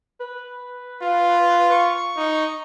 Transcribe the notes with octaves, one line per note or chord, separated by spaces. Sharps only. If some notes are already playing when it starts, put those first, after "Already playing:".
B4
F4
C#6
D#4